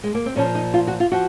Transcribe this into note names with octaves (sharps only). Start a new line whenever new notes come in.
G#3
A#3
C4
A#2 F3 C#4
D#4
F4
F#4
F4
F3 F#4